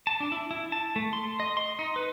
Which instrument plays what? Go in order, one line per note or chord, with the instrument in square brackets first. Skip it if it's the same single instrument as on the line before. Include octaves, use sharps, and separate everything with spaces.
[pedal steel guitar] A5
D4
E4
E4
A5
A3
C6
D#5
C6
D#4
B4